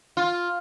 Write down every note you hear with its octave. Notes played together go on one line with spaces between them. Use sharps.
F4